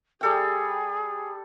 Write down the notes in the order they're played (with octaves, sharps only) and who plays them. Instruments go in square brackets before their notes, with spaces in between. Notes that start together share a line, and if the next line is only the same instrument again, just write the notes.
[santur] G3 A4 G5 [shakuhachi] G#4